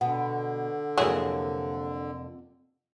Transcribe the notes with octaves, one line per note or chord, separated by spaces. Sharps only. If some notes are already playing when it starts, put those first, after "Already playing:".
B2 D3 F#5
F2 C3 F#3 A#3 E4 G#4